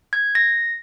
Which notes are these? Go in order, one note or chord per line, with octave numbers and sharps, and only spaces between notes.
G#6
A#6